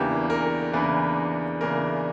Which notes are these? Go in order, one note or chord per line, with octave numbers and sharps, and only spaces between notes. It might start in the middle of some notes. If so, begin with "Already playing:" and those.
Already playing: E2 C#3 E3 A#3 D4 G4
A#4
E2 C#3 E3 A#3 D4 B4
E2 C#3 E3 A#3 D4 A#4